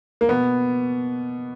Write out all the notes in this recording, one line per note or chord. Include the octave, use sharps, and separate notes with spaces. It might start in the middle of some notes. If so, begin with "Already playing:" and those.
A#3
B2 B3